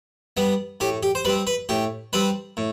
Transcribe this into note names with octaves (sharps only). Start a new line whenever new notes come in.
G3 B3
A2 G4
G4
C5
G3 C4 B4
B4
A2 G4
G3 C4 B4
A2